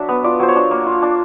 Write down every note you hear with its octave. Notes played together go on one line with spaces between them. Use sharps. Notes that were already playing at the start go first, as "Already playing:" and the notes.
Already playing: F#3 D4 E5
B3
F4 D5
F#3 C5
C#5
D4
A#3
F4
D4